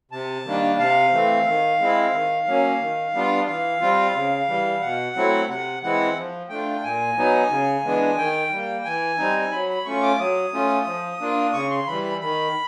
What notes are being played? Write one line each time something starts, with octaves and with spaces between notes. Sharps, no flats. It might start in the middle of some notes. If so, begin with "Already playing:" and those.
C3 A5
D#3 G3 A#3 D4
C3 F5
E3 A3 C4
D#3
G#3 C4 E4
D#3
F#3 A#3 C#4
D#3
G3 B3 D4 F4
E3 F5
G3 C4 F4
C#3
E3 G3
B2 F#5
F#3 A3 C4 E4
C3 F#5
E3 G#3 C4 E4 F#5
F3
A3 D4 F4 G5
A#2 G#5
F#3 B3 D#4
C#3
E3 G#3 B3 D4
D#3 G5
G3 A#3
E3 G#5
G3 C4 D#4
F#3 B5
B5
A3 C#4 F4 C#6
D6
F#3 D#6
A3 C#4 F4
F3
A#3 D4 F4
C#3 C#6
C6
E3 G3 B5
B5
D#3 B5